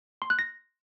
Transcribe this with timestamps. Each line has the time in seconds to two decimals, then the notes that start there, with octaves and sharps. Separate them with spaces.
0.22 C6
0.30 F#6
0.39 A#6